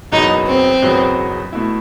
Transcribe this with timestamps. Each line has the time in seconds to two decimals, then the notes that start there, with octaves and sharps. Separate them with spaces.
0.12 F#1 E2 B2 F#3 B3 D#4
0.47 C4
0.82 F#1 E2 B2 F#3 B3
1.53 B2 A3 E4